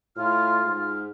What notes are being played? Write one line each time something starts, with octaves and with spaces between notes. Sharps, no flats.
A2 F4 F6
G#2